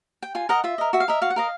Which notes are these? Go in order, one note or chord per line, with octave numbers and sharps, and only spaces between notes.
G5
F4 G#5
A#4 D#5 F#5
F4 E5
A#4 D#5
F#4 E5
F5
A#4 D#5 E5
F#4 F5
F#5
A#4 D#5 F5